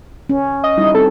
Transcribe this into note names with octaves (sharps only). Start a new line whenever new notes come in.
C#4
D#5
G3 D#4 E4
C4 A4